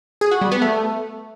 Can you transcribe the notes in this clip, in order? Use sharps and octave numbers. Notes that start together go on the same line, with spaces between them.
G#4
F#4
G3
B3
A3